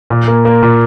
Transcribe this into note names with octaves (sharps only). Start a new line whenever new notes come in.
A#2
A#3
A#3
A#2